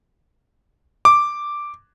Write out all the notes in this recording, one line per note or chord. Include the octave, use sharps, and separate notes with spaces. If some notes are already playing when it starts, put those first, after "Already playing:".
D6